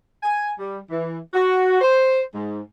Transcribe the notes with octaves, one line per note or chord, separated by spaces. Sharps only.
G#5
G3
E3
F#4
C5
G#2